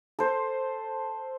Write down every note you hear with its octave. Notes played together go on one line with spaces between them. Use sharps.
A4 C5